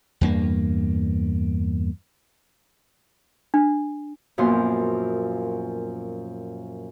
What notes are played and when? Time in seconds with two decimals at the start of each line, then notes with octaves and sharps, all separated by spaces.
0.21 E2 G2 A#3
3.54 D4
4.38 F#2 A#2 F3 B3 C6